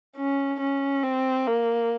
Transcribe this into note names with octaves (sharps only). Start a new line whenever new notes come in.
C#4
C#4
C4
A#3